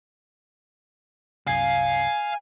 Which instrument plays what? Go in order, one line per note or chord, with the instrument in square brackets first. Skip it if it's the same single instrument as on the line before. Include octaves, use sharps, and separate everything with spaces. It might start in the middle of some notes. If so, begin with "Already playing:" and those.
[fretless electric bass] C2 F#2 [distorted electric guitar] F5 [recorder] G#5